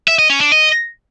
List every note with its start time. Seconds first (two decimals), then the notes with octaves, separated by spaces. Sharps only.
0.08 E5
0.19 D#5
0.30 C#4
0.41 D4
0.52 D#5